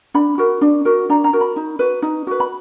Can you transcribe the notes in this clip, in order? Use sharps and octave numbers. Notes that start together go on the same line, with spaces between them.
D4 B5
F#4 A#4
D4
F#4 A#4
D4 A#5
A#5
F#4 A#4
B5
D#4
F#4 B4
D#4
F#4 B4
B5